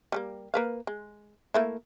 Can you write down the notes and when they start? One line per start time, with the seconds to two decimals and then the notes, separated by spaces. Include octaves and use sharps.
0.12 G3 A3 A#3
0.54 A#3 B4 F5
0.87 G#3
1.54 A3 A#3 E4